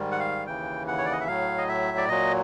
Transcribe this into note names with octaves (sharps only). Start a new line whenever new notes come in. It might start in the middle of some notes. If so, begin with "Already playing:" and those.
Already playing: G#2 D#3 G3
F#5
F5
D#2 C#3 E3 G5
F#5
C#5
D5
D#5
E5
A2 F#3 F5
D#5
E5
D5
A#2 F#3 D#5